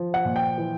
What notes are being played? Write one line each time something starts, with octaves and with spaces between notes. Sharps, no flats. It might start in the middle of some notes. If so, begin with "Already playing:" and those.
Already playing: F3
F#5
A#2
G5
E3